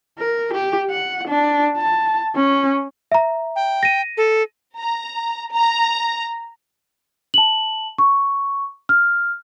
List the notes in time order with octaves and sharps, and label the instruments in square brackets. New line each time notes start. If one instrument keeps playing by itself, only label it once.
[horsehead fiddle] A#4
G4
F#5
D4
A5
C#4
[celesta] E5 A#5
[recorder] G5
[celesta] A#6 D#7
[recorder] A4
[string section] A#5
A#5
[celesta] A5 F#7
C#6
F6